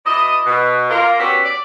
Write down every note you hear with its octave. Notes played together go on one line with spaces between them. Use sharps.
B2 E4 D5 D#5
B2
A#3 F4 A#4
G3 B3 C#4 F#4 G4 E5
D5